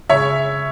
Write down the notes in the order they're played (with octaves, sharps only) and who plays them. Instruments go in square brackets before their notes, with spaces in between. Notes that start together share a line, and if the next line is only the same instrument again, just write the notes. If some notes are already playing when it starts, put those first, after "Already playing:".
[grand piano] C#3 C#5 E5